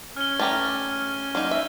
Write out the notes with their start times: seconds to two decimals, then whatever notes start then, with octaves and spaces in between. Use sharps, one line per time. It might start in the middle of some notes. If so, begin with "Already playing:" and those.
0.16 C#4 G#5 F6 G7
0.39 A3 G4 A#5
1.35 F#3 A#3 D#4
1.51 E5